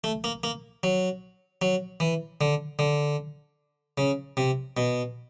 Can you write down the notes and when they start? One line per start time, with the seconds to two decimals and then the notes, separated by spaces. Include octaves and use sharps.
0.04 A3
0.24 A#3
0.44 A#3
0.83 F#3
1.62 F#3
2.00 E3
2.41 D3
2.79 D3
3.98 C#3
4.37 C3
4.77 B2